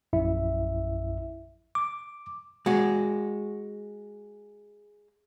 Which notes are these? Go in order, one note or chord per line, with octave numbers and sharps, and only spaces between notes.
A#1 F#2 E4 E5
D6
G#3 F#4